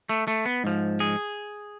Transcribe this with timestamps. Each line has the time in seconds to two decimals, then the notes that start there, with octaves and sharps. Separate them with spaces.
0.09 A3
0.28 A3
0.46 B3
0.64 G#2 F3
1.00 G#4